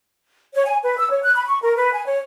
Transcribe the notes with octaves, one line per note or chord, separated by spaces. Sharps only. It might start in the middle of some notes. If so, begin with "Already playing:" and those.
C#5
G#5
B4
E6
C#5
F#6
B5
C#6
A#4
B4
G#5
C#5